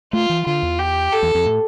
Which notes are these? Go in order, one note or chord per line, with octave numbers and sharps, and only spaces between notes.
A3 F4
E3
D3 F4
E2
G4
A4
E2
F2
A2